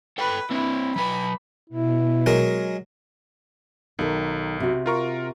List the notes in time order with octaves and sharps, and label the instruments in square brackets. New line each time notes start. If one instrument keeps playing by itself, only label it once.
[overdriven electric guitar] A4 G5 [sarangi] B4
[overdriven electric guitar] C4 D4 [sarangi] E4
[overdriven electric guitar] F#3 B4 [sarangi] B5
[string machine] B2 [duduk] E4
[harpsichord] F#3 G#3 A#4
[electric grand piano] B1 [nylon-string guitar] D#3 A4
[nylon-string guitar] C3 F#4
[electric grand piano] F4 A#4 C#6